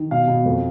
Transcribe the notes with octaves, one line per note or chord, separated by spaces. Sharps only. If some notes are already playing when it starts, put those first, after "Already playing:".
Already playing: D#3
B2 F5
B2
F2